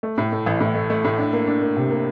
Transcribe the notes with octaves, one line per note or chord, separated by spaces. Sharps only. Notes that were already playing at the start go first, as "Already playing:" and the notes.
A3
A2
A3
A1
A2
A3
A3
A2
D4
A#3
D4
A#3
C3
A#3